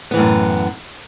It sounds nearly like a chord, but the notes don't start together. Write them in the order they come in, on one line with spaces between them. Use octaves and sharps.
B3 E3 A2 F#2